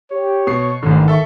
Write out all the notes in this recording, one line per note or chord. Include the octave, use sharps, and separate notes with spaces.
G4 C#5
B2 C#6 C7
A1 G#2 D3 D#3
A4 E5 C#6